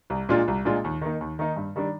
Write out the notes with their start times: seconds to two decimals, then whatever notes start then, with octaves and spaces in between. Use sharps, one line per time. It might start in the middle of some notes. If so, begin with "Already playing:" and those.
0.10 C2
0.29 A#2 G#3 D4 F4
0.48 C2
0.65 A#2 G#3 D4 F4
0.84 D#2
1.01 D#3 A#3 D#4
1.21 D#2
1.39 D#3 A#3 D#4
1.56 G2
1.76 D#3 G3 D4